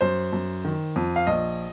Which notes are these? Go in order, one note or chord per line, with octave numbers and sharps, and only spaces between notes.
F#2 C5
F#2
D#3
F2
F5
A#1 D#5